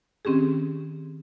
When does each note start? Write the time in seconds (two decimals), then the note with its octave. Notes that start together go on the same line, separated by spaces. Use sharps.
0.25 D#3 C4 C#4 G4 G#4